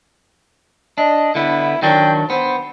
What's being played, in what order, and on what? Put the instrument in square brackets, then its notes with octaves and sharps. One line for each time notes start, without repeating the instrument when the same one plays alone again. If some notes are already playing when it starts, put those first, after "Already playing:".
[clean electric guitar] D4 [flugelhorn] D#5
[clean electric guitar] D3 B3 [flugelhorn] E4
[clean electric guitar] D#3 F#3 D4 [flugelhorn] G5
[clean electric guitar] B3 [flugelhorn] C5